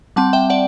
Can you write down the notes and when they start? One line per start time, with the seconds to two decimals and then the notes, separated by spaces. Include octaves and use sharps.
0.16 G3 C4 F#5 A5
0.33 E5 G5
0.50 D5 F#5